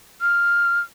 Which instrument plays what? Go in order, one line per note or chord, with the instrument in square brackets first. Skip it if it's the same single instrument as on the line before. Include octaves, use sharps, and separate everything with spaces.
[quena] F6